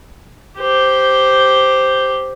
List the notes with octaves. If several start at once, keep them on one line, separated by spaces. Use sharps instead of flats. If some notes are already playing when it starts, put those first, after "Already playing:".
G4 C5